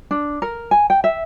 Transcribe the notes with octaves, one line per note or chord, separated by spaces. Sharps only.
D4
A#4
G#5
G5
E5